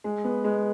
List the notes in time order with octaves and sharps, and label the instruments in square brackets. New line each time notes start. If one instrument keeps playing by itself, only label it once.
[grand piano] G#3
B3
G#3